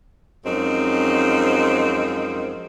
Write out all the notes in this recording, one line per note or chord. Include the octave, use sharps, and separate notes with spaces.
F#2 F3 G#3 C4 D#4